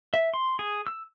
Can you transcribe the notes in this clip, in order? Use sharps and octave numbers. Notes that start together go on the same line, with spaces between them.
E5
C6
G#4
E6